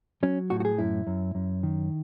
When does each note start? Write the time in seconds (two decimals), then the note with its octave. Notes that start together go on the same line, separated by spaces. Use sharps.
0.23 F#3 C#4
0.50 A2 F#4
0.60 F#4
0.65 G#4
0.79 F#2 E4
1.07 F#2
1.35 F#2
1.63 D#3